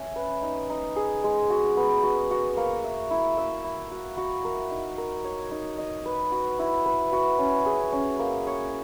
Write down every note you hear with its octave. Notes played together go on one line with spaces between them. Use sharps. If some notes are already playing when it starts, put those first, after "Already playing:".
Already playing: C#4 E5
B4
D#4
D#4
G#4
G#3
F#4
B3
F#4
F#4
A#3
E5
E4
E5
E4
F#4
F#4
A#4
D#4
A#4
C#5
D#4
D#5
B4
F#4
E4
B4
F#4
C#4
G#4
C#4
A#3
C#5